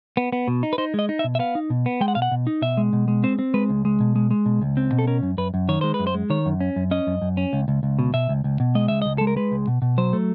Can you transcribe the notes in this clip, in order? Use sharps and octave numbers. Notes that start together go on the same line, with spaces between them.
B3
B3
B2
D#4
B4
D#4 C5
G#3 D#5
D#4
E5
B2
E5
B3 F5
D#4
B2
B3
G#3 G5
F#5
B2 F5
F#5
B2
D#4
B2 E5
G#3
B2
G#3
C4 C5
C4
G#3 B4
C#2
G#3
B2
G#3
G#3
B2
C#2
C4
B2
A4
C#4 A#4
F#2
F#2 B4
F#2
D#3 C#5
G#3 C5
B4
F#2
C5
G#3
D#3 C#5
F#2
C#4
F#2
C#4 D#5
F#2
F#2
C#4
C#2
C#2
C#2
B2
B2 E5
C#2
C#2
B2
G#3 D#5
C#2 E5
C#2 D#5
G#3 A4
A#4
G#3 B4
C#2
B2
B2
F#3 C5
A3